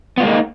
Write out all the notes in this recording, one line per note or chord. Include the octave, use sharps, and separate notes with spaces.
G#3 A#3 B3 D#4 F4